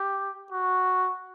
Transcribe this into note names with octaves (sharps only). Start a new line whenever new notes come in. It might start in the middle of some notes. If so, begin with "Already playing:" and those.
Already playing: G4
F#4